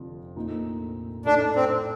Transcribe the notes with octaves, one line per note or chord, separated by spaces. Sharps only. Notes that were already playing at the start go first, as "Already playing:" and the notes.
Already playing: F1 F2 D3
A#1 A#2 A3 C4 D#4
A2 A3 D4 D#4 A4
C4